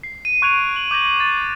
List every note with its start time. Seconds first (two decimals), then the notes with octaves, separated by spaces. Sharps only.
0.03 C7
0.25 D#7
0.42 C#6 F#6 G#6 D7 F7
0.76 F#7
0.91 D6 G6 G#6 A#6 F#7
1.20 A6